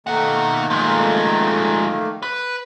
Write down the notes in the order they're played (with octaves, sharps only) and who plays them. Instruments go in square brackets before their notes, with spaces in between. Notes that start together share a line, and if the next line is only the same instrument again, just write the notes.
[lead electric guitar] B2 F#5 [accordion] D#3 A3 A#3
[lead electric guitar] F3 G#3
B4